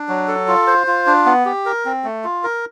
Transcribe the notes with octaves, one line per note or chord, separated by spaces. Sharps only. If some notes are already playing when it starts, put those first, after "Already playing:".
Already playing: D4
F#3
A4
F4
C5
F4
D4
B3
G4
A#4
C4
A3
F4
A#4